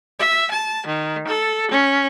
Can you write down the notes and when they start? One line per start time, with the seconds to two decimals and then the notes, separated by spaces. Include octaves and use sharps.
0.19 E5
0.51 A5
0.86 D#3
1.27 A4
1.71 C#4